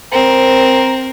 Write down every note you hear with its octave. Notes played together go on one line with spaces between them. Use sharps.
C4 A#4